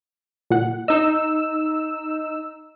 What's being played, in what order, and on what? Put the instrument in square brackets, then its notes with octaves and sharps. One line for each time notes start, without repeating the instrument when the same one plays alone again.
[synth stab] A#2 F#5
[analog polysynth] D#4 E6 [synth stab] D#5